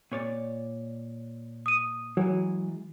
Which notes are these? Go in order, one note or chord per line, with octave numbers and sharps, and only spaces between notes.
A#2 C#5 D5
D#6 D#7
E3 F#3 G#3